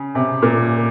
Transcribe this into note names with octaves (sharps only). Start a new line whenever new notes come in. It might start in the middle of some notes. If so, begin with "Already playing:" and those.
Already playing: C#3
C3
A#2